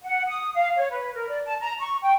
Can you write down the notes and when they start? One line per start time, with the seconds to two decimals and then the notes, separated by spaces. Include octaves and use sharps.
0.04 F#5
0.28 D#6
0.56 F5
0.78 C#5
0.91 B4
1.15 A#4
1.29 D5
1.45 A5
1.60 A#5
1.80 C#6
2.03 G5